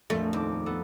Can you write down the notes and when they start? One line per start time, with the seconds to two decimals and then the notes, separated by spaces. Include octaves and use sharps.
0.10 A#1 F2 A3
0.33 D#2 C4 D6
0.66 B3 A4